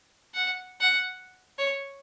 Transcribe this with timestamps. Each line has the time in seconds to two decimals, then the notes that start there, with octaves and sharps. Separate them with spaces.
0.34 F#5
0.81 F#5
1.58 C#5